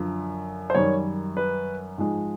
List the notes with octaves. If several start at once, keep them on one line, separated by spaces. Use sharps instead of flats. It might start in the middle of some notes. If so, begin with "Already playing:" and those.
Already playing: F#2 D3 F3
C5
F#2 D#3 G3 C#5
B4
G#2 F3 G#3